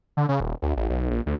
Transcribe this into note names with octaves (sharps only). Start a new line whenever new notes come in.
D3
C#3
D#1
D2
A1
B1
A#1
D2